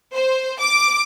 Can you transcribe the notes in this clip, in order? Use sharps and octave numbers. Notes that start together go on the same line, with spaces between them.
C5
D6